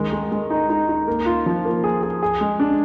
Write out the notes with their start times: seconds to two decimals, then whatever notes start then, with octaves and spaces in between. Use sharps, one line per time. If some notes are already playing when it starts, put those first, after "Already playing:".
Already playing: D#3 G#3
0.13 G#3
0.32 G#3
0.50 D#4
0.70 D#4
0.89 D#4
1.08 A#3
1.26 F4
1.46 F3
1.65 A#3
1.84 G#4
2.03 G#4
2.23 G#4
2.41 G#3
2.59 D4